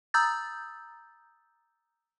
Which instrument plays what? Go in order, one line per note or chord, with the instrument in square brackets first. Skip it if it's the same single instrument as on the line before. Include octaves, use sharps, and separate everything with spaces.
[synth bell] A#5 D#6 E6 G6 A6